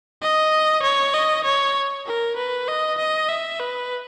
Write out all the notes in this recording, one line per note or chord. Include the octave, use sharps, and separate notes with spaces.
D#5
C#5
D#5
C#5
A#4
B4
D#5
D#5
E5
B4